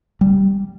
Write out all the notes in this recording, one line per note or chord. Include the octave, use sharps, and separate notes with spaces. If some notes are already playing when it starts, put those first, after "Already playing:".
G3